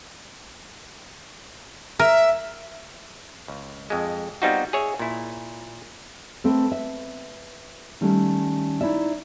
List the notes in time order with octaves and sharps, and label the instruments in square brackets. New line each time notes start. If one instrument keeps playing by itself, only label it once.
[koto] A#4 [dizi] E5
[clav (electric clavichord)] C#2
F2 G#3
G3 B3 C4 D#4 F4 F#4
G#4 C#5 E5
A#2 E4
[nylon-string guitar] A3 C4 A4 B4
E5
D#3 G3 A3 C#4
D#4 E4 C#5 D5 E5